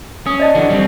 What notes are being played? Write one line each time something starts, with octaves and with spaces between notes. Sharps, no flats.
C#4 D#6
D5 D#5 A5
D3 E3 F#4
G3 C4